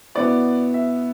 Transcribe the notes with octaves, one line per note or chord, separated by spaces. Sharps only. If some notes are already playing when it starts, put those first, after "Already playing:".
B2 B3 E4 D5
E5